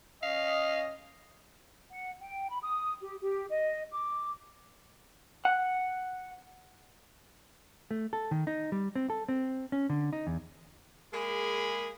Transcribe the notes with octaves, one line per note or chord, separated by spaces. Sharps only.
C#4 D#5 F5
F#5
G5
B5
D#6
G4
G4
D#5
D6
F#5
A3
A4
D#3
D#4
G3
C4
A4
C4
C#4
D3
D#4
E2
G#3 A#3 G#4 B5